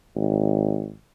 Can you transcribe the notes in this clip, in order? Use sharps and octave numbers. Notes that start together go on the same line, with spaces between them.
G#1